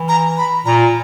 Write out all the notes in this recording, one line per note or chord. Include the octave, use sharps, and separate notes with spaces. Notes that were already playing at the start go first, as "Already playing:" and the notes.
Already playing: E3
A#5
B5
A#2 A#5